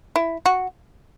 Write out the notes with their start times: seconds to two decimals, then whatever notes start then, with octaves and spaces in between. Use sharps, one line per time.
0.16 E4
0.46 F#4